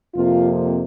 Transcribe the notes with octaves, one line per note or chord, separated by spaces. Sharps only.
F2 C3 F3 A#3 F4